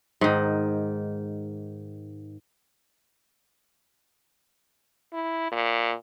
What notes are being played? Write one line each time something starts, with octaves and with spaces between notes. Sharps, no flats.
G#2 D#3
E4
A#2